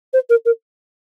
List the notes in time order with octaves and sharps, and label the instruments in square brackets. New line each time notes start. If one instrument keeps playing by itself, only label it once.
[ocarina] C5
A#4
A#4